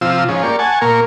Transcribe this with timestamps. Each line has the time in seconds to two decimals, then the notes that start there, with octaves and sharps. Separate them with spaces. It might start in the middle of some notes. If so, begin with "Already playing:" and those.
0.01 C3 F3 F4 E6
0.29 G#2 F3 C#4
0.43 A#3 G4 D5 C#6
0.59 F#5 G#5 A5 C#6
0.81 A#2 A#3 A#4 C#6